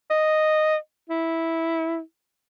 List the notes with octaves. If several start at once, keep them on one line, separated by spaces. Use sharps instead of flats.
D#5
E4